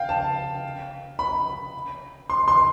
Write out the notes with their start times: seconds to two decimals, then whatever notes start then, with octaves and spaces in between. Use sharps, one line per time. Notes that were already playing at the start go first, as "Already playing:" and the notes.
Already playing: F5 G5
0.09 A5
1.19 B5
2.30 C6
2.48 C6